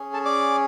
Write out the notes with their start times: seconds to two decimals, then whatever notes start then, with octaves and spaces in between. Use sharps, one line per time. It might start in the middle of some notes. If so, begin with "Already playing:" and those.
Already playing: C#4 G#4
0.13 A4 A5
0.25 D5 D6